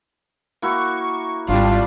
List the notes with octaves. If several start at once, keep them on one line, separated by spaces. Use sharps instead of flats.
A#3 E4 F#4 C#6
G#1 G3 D4 F4